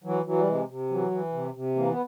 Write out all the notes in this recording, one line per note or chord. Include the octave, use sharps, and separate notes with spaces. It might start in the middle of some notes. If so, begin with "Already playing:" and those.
E3 F#3
E3 F#3
G3
C3 G#3
C3
E3 F#3
E3
C3
C3
E3 A#3
B3